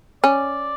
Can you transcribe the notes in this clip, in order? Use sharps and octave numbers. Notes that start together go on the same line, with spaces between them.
C#4 D5